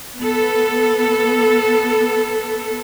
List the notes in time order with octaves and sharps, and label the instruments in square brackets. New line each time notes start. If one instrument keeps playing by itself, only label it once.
[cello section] B3 A4